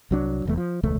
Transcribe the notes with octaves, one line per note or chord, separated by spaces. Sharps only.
C2 F#3 D4
F1 E2 A3
F3
E1 C#2 A3